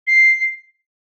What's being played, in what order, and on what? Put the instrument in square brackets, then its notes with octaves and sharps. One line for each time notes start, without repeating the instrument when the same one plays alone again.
[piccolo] C7